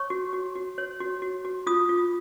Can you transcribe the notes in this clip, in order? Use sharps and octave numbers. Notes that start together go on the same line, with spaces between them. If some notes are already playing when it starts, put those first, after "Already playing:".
Already playing: C#5 C#6
F#4
F#4
F#4
C#5
F#4
F#4
F#4
F4 D#6
F4